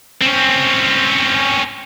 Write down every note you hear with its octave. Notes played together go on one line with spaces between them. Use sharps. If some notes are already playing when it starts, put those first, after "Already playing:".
C4 C#4